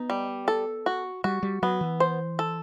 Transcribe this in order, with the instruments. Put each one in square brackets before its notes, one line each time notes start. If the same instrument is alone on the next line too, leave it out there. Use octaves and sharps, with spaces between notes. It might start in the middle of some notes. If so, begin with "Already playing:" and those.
Already playing: [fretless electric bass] B3 [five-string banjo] D#4
[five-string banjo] G3
A4
F#4
[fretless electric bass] G3 [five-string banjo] F#4
[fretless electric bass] G3
[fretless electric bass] F#3 [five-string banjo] B3
[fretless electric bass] E3
[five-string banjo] C5
A4